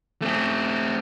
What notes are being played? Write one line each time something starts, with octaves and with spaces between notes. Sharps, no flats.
A3 C4